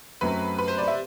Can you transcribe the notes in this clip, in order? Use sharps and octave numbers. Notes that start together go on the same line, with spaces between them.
F#2 F#3 A3 C4 B4
B4
C5
D5
E5